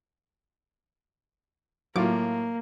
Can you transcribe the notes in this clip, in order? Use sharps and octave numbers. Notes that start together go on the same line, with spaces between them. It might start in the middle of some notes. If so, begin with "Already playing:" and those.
A2 F#3 A#3 F4 D6